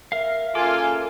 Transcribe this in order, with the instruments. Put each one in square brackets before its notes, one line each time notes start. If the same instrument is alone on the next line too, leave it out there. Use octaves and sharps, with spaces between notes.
[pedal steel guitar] A#4 F5 [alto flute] E5
[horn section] C#3 A#3 G#5 [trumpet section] F4 [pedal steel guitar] A4 D6